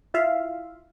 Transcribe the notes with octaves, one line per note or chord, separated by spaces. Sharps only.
E4 F4 E5 F5